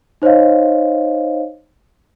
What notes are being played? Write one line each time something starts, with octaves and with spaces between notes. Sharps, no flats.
D#4 C5 C#5 D#5 F5